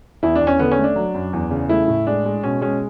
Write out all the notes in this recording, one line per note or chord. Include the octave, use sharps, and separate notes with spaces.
E2 E4
D4
E2
C#4
D3 B3
C#4
A3
D4
F#3
F#2
E2
C#3
A3 E4
A2
G#3 D4
G#3
B2 C#4
G#3 C#4